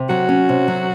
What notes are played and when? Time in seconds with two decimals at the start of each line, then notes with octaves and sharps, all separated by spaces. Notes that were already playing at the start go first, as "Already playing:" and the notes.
Already playing: C3
0.09 F#3 F#4
0.29 C#4
0.49 C3
0.68 F#3